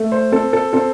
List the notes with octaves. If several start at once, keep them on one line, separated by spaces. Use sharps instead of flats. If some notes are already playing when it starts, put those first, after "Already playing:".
Already playing: A3
C5
C4 A4
A4
C4 A4